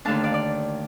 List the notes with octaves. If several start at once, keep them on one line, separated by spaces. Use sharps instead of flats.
D#2 D3 A3 D4 F5 A5
D5 F5
D5